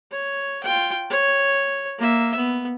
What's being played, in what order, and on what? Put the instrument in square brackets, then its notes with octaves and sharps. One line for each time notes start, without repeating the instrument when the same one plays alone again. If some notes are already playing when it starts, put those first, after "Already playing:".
[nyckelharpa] C#5
F4 G5
C#5
A#3 E5
B3